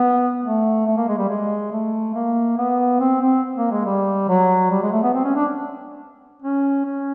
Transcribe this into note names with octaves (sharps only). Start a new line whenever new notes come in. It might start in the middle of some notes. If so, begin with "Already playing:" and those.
Already playing: B3
A3
A3
A#3
G#3
G3
G#3
A3
A#3
B3
C4
C4
A#3
G#3
G3
F#3
G3
G#3
A3
B3
C4
C#4
D4
C#4
C#4